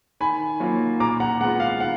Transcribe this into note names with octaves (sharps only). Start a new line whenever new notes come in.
D#3 G#5 B5
F#3 A#3 F4
A#2 A#5 D6
F#5 A#5
G#3 B3 F4 F#5
F5
D#3 F#5